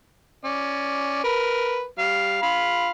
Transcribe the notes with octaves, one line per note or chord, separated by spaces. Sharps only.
C#4 D5
A#4 B4
G3 F5
F4 F5 B5